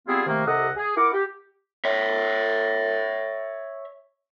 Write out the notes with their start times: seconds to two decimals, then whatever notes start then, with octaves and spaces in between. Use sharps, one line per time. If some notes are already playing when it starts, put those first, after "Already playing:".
0.07 G3 B3 C4 E4 F4 G#4
0.26 C3 D#3 A3 A#3
0.46 C2 C3 A4 D#5 F#5
0.76 G#4
0.95 E4 A#4 F#5 D6
1.13 G4
1.85 C#5 E5